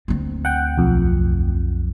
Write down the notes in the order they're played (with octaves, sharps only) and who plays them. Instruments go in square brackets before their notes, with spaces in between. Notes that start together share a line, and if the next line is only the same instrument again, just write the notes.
[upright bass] D2 C4
[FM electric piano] F#5 G5
B1 F2